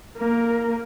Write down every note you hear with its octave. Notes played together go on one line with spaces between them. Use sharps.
A#3 A#4